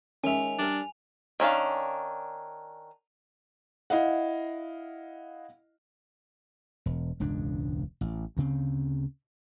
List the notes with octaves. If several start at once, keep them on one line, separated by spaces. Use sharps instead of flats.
D#3 G#3 C#4 E5 G#5 F7
G3 D4 A#4
D#3 C#4 D4 F5
E4 D#5 F5 F#5
E1
E1 C#2 G#2 D4
A1
D2 C#3 C4